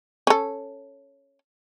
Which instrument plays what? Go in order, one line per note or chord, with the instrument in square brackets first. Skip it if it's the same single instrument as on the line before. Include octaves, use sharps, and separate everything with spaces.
[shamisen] C#4 A4